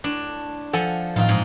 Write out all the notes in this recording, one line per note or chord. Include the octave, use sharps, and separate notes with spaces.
A2 D4
F3 A4 F#5 G#5
A2 D#3 F3 C4 D#4 F4 F5
G#2 D#4